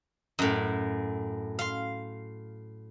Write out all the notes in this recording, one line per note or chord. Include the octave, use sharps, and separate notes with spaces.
F#2 A2
F5 C6